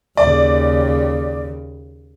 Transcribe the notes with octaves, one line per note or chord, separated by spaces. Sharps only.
D#2 C#3 D5